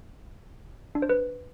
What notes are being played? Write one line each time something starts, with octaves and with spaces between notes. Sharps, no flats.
D4
C5
B4